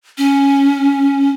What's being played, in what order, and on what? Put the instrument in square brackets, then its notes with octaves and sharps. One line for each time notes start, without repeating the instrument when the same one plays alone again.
[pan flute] C#4